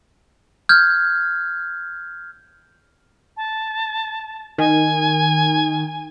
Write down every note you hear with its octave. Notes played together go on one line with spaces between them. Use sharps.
F6 G6 G#6
A5
D#3 G#5